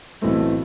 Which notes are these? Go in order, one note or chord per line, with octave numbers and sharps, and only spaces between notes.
B1 A2 E3 A3 C4